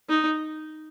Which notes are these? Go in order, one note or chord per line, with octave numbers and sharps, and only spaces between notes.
D#4